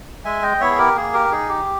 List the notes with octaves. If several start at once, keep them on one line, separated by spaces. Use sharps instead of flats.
G#3 E5 G#5
D#5 G5
B3 E4 C#5 E5
G#4
G4 A#4
A#3 G#4
G4 A#4
D#4 G#4
G4